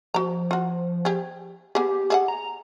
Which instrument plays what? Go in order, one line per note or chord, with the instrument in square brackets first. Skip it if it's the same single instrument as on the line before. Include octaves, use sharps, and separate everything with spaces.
[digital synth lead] F3 [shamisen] F#4 A#5
[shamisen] F4 F#4
G4 G#4
[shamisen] B3 G#4 [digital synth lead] G4
[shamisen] G#4 E5 F#5
[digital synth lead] A#5